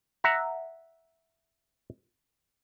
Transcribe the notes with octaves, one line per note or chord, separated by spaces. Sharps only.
E5 F#5 A#5